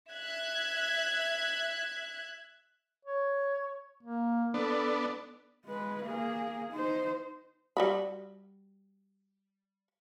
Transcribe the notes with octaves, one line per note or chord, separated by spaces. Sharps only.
E5 F#6 G#6
C#5
A#3
B3 D4 A4
G#3 B4
A#3 G#4
D#4 C5
G3 F#4 B5